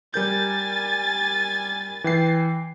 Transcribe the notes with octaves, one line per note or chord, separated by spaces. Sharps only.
G3 A#4 G#5 G6 A6
E3 G5 C7